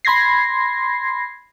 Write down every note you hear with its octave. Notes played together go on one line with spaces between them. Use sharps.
B5 C6 G#6 A#6 C7